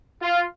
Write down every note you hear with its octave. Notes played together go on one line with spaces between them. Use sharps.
F4